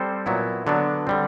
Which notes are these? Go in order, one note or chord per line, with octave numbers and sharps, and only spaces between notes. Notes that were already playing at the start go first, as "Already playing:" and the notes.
Already playing: G3 C4 A4 C5
A#2 F#3 B3 E4
D3 F#3 B3 D4
D3 G3 C4